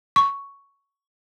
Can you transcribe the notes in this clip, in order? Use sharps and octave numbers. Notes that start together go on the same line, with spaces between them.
C#6